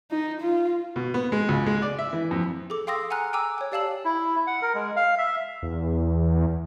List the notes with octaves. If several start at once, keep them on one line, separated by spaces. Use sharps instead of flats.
D#4
F4
B2
B3
G#3
C#2
G#3
D5
E5
E3
F2
G#4 A4 D6
F5 G5 C6 D#6 E6 A#6
F#5 G#5 A#5 F6 F#6
G5 G#5 A#5 D6 E6
C#5 G5
G4 D5 F5 A5 E6 F#7
E4
F#5
A#4
G#3
F5
E5
E2